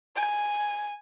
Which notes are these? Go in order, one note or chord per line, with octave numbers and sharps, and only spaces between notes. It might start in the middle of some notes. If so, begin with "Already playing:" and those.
G#5